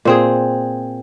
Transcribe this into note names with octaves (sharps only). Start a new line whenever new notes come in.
A#2 C4 G#4